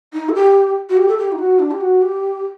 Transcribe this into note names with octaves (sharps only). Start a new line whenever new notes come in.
D#4
A4
G4
F#4
G4
A4
G4
D#4
F#4
D4
G4
F#4
G4